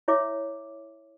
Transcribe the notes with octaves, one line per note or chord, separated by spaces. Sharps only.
E4 C#5 E5 D6